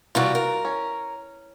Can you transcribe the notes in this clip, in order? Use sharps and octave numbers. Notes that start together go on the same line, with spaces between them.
C3 E3 G3 F4 F#4
A#4
C#4